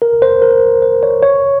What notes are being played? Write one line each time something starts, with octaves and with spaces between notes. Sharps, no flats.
A#4
C5
A#4
C5
C#5
C#5